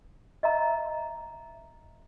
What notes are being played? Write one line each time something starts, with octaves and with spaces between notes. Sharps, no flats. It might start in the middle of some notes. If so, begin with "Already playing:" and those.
D#5 E5 A#5